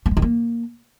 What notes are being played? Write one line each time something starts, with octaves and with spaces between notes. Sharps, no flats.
A3
G#3
D#3
A#3